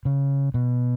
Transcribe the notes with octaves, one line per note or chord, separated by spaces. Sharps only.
C#3
B2